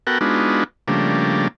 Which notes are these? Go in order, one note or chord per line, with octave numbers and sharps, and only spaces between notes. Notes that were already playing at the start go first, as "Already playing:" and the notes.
B3 F#4 A4 A#4 F#5 G5
G#3 B3 D4 D#4 F4 F#4
C#3 F3 G3 A3 A#3 D4